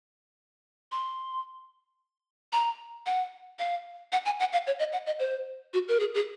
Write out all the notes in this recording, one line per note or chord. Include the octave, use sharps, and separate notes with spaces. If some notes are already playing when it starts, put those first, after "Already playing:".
C6
A#5
F#5
F5
F#5
G#5
F#5
F5
C#5
D#5
F#5
D#5
C5
F#4
A#4
G#4
G#4